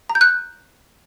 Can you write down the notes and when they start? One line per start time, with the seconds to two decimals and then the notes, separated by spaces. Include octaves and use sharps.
0.09 A#5
0.15 G6
0.21 F#6